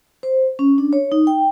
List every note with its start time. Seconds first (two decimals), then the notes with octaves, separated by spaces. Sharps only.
0.23 C5
0.59 C#4
0.78 D4
0.93 C#5
1.12 D#4
1.27 G5